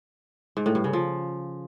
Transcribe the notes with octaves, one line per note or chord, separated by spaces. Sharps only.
G#2
A2
G2
C#3
F3